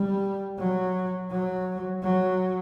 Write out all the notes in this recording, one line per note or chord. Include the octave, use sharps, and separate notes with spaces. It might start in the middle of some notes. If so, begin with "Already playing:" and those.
Already playing: G3
F#3
F#3
F#3